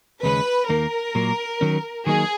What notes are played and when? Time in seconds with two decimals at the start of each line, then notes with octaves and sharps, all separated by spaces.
0.23 D#2 C#3 G#3 C#4 B4
0.69 D#2 D#3 A#3 A#4
1.15 A#2 F#3 A#3
1.61 D#3 F#3 C#4
2.07 D#3 F#3 A#3 D#4 G#4